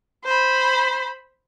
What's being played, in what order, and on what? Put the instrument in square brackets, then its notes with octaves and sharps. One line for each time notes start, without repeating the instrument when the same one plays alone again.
[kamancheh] C5 B5